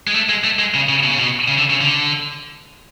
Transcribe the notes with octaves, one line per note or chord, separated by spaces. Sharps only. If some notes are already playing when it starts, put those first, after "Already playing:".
G#3
A3
G#3
A3
G#3
C#3
C#3
B2
C#3
B2
C#3
D3
C#3
D3